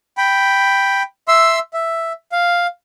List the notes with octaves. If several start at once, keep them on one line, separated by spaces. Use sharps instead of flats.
G5 B5
E5 C6 E6
E5
F5